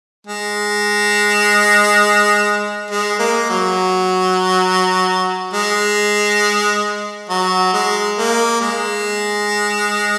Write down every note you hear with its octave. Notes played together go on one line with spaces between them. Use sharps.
G#3
G#3
A#3
F#3
G#3
F#3
G#3
A#3
G#3